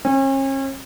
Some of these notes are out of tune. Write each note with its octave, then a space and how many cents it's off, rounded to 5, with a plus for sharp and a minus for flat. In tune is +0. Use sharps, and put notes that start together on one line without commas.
C#4 -40